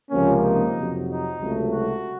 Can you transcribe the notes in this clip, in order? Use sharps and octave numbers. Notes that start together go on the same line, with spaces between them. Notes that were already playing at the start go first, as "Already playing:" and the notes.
C#2 C3 F3 A#3 C#4
D#4
F2 C3 F#3
D#4
C#2 C3 F#3 A3
F#4